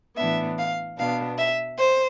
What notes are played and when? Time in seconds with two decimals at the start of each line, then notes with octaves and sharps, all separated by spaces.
0.17 A2 E3 B3 D4 E5
0.58 F5
0.98 B2 B3 D4 F5
1.38 E5
1.79 C5